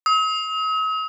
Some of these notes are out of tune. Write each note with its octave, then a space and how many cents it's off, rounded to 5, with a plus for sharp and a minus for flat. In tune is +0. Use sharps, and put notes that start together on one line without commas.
D#6 +45